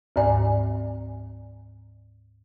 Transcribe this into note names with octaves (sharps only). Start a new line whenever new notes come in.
D2 G#2 D5 G#5